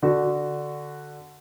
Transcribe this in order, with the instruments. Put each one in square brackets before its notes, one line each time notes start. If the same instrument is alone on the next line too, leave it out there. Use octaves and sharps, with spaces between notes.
[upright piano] D3 F#4